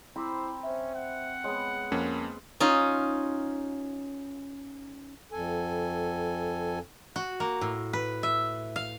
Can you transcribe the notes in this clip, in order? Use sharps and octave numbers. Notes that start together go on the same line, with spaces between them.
C4 E4 C5 A#5 B5 D6 E6
C#4 C5 E5
F#5
G#3 B3 C#5
F2 A#3 C#4
C#4 D#4 F4
F2 A4 G#5
F#4
A#3
A2
B4
E5
F5